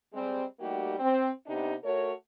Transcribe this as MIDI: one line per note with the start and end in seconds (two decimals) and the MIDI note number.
0.13 0.43 55
0.13 0.43 56
0.13 0.43 60
0.59 0.95 55
0.59 0.95 57
0.59 0.95 58
0.59 0.95 63
0.59 0.95 66
0.59 0.95 67
0.99 1.29 60
1.47 1.74 48
1.47 1.74 59
1.47 1.74 62
1.47 1.74 63
1.47 1.74 67
1.84 2.11 57
1.84 2.11 66
1.84 2.11 70
1.84 2.11 73